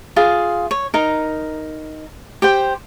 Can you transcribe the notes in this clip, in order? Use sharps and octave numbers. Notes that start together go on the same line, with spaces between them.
F4 G#4 F5
C#5
D#4 A#4
G4 C5 G5